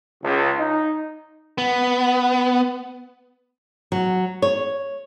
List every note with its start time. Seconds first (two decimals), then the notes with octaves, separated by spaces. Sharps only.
0.24 C#2
0.58 D#4
1.58 B3
3.92 F#3
4.42 C#5